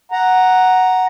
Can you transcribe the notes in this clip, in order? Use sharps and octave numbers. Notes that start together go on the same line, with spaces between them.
F#5 A#5